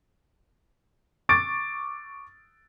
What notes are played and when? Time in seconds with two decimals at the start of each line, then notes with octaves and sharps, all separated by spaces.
1.29 C#6 D6 A6 D7